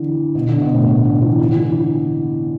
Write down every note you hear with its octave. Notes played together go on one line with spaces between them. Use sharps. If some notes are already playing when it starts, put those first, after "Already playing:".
Already playing: D3 E3
B2
D3
B2
A2
B2
D3
E3
E3
D3
E3